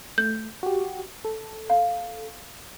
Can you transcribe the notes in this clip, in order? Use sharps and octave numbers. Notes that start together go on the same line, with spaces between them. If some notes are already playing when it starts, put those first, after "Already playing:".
A3 G6
F#4 G4
A4
F5